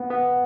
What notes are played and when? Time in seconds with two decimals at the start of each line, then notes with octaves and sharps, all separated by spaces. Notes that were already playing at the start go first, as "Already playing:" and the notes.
Already playing: B3
0.11 B3